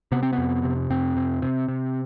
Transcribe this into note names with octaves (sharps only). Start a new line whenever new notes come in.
C3 B3
C4
B3
F2
C3
F2 C4
C3
C3
C3